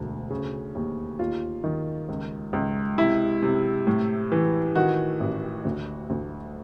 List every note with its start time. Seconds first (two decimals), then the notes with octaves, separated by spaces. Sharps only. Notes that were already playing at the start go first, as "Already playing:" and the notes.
Already playing: E1 D2
0.30 C#3
0.75 D#2
1.19 D#2 F4
1.64 D#3
2.09 C#2
2.53 C#2
2.98 C3 E4
3.42 C3
3.87 A2
4.32 E3
4.75 D#3 F#4
5.20 A1
5.65 D2
6.10 D2